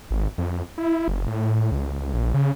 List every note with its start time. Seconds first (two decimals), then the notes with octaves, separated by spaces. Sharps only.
0.11 G#1
0.38 F2
0.78 E4
1.08 F#1
1.28 A2
1.72 C#2
2.14 A#1
2.34 C#3